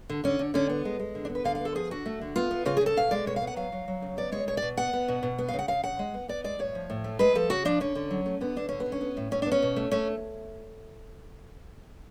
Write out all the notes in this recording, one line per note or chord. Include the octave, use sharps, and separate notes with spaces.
D3
D3 C#4
D3
D3 C#4
B3
G#3
G#3
D3
D4
B3
B4
D3 F5
F5
B3 A4
F3 G#4
D3 F#4
A3
D3
B3 F4
B3
C#3 F4
G#4
C#3
A4
B2 F5
G#3 D5
B2 C#5
F5
B3
F#5
F#3 F5
F#3
F#3
C#3
B3 D5
G#3 C#5
B2 C#5
D5
B2
B3 F#5
B3
B2
B2
B3
F5
C#3
F#5
C#3 F5
C#3 F#5
G#3
B3
B3 D5
G#3 D5
A2 C#5
F3
A2
A3
G#3 B4
F3 A4
C#3 F#4
F3 D4
D3 C#4
D3
F#3
A3
D3 B3
D3 D4
D3 C#4
B3
D3
C#4
B3
A2
A2 C#4
B3 D4
C#4
B2
A3
A3 C#4